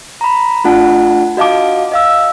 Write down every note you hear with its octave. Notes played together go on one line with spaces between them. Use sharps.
A#5 B5
A3 D4 F4 F#5 A5
F#4 D#5 F5 A5 D6
D#5 F5 E6